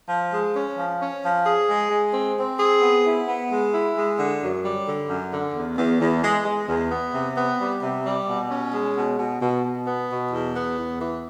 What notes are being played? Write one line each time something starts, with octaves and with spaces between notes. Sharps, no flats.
F3
G#3
C#4
F3
C#4
F3
G#4
G#3
G#3
C4
C4
G#4
B3
E4
B3
G#3
E4
G#3
D3
F#2
G3
D3
F#2
D3
E2
E2
E2
G#3
G#3
E2
B3
C3
B3
G3
C3
G3
B2
C#4
G#3
B2
B2
B2
B2
B3
B2
E2
B3
E2
E3